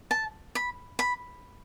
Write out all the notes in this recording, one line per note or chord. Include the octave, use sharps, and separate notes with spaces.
A5
B5
B5